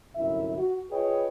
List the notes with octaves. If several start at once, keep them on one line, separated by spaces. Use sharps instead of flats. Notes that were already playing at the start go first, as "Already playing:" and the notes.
G1 C2 F#2 E4 E5
F#4
F4 G#4 B4 C#5 D#5 G5